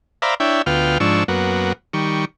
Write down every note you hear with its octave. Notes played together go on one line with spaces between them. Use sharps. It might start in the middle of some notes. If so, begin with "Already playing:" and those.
C5 D5 E5 F5 A#5 B5
D4 E4 C#5 E5 G5
D2 B3 F4 G5 F6
G#2 F3 D4 C#6 E6
F#2 A#3 B3 F#4
D#3 G3 C#6